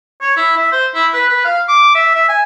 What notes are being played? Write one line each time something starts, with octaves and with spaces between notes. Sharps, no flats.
C#5
E4
E5
C5
E4
B4
B4
F5
D6
E5
E5
G#5